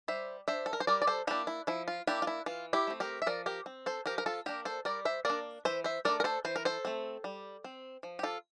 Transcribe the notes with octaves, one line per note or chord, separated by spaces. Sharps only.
G3 C5 E5
D4 C5 E5
A4
A#4
C5
G3 A#4 D5
D5
A4 C5
A#3 D4 E4 G4
E4
F3 E4
F4
A#3 D4 E4 G4
F4
E4
E3 F4
E4 G4
A3 C4
G4 A#4
E5
F3 A#4 D5
G4 A#4
C4
A4 C5
F3 G4 A#4
A#4
F4 A4
A#3 D4 G4 A#4
A4 C5
G3 A#4 D5
C5 E5
A#3 D4 A#4 D5
E3 C5 E5
C5 E5
A3 D4 A#4 D5
A#4
A4 C5
E3 C5
A#4
A4 C5
A3 C4
G3
C4
F3
G4
F4 A4